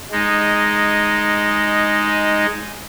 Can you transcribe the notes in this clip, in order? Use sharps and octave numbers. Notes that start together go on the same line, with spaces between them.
G#3 D#4